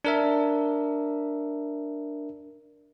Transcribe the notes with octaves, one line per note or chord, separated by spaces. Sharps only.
D4 A#4 E5